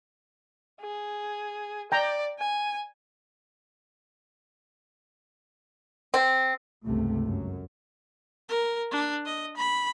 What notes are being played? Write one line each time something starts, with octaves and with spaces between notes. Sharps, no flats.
G#4
D5 G5 A#5
G#5
C4
G1 C#2 C3 A3
F#2
A#4
D4
D#5
B5